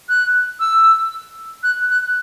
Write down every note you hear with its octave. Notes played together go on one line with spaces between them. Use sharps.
F#6
E6
F#6
F#6